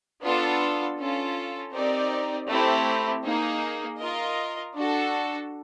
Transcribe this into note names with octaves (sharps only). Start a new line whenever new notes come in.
B3 D4 F4 A4
C#4 F4 A4
C4 D#4 G4 A#4 D5
A3 C4 E4 G4
A#3 D#4 G#4
F4 A#4 D#5
D4 F#4 A4